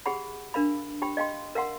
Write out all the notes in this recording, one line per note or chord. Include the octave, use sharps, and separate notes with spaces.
G4 G#4 F#5 B5
D4 A#4 F5 B5
G4 G5 B5
D#5 F5 G5 C6
A#4 F5 F#5 C6